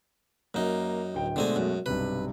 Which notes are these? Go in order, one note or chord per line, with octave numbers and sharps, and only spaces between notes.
F#2 A#3 D#4
D1 G5
B2 D3 G#3 A3 C4 G#5
F#2
B1 G2 C3 B4